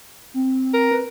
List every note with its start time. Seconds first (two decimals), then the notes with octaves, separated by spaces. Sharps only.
0.34 C4
0.73 A#4
0.91 B4